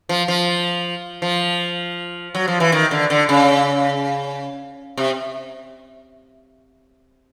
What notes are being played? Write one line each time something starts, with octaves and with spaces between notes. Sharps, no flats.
F3
F3
F3
F#3
F3
E3
D#3
D3
D3
C#3
C3